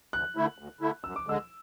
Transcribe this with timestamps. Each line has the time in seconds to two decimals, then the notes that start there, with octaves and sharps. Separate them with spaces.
0.13 D2 F#6
0.36 D3 A3 E4
0.58 D2
0.81 D3 A3 E4
1.04 F#2 E6
1.16 D6
1.27 D3 G#3 E6